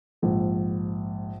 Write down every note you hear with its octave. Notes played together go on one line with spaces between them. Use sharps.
A#1 G#2 F3